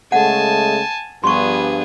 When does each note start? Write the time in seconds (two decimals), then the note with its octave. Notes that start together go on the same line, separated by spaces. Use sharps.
0.12 C#3 G#3 A3 F#5 G#5 A5
1.24 G2 F3 B3 G#4 C6 C#6